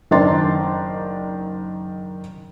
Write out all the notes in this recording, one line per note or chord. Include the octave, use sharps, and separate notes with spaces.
F#1 D#3 D4 A#5 C6 A6